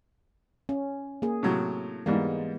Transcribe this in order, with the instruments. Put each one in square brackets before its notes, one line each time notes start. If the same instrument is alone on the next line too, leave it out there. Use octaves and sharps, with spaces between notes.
[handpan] C#4
A#3 G#4
[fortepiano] A2 C3 F#3
[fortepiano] G#2 G3 A#3 [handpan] E3 G#3 B3